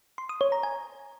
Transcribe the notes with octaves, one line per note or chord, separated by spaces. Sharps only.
C6
D#6
C#5
A#5
G#5